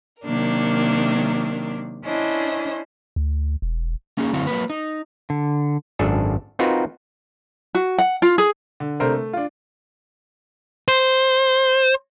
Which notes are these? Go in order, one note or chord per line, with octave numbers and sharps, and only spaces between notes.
C3 D#3 F#3 A#3 D4 A#4
C#4 D4 E4 C5 D#5
D2
E1
A#3 C#4 D#4 G#4
F#2 D3 C4 E4 F#4 F5
F#3 A#3 B4
D#4
D3
G#1 F#2 D4 G#4 A4
C4 D#4 F4 F#4 A#4 B4
F#4
F#5
F4
G#4
D3
C3 A3 D4 A#4 C5
A3
D4 F4
C5